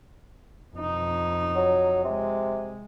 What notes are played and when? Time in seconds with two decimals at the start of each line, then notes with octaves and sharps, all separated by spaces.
0.76 F2 D#4
1.56 F#3
2.04 C3 G#3